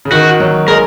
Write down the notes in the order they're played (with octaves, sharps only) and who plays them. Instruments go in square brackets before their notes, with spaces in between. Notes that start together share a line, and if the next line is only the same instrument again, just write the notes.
[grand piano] C#3
[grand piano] D#3 [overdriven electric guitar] F#4
[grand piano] F#3
[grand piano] G#3 [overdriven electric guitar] A#4